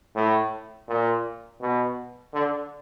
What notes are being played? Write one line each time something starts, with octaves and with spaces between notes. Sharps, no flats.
A2
A#2
B2
D3